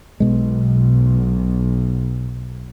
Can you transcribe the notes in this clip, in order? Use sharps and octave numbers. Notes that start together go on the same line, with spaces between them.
B1 B2 G#3